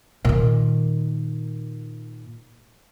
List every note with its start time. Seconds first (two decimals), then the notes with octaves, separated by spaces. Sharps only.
0.25 A#2 D#3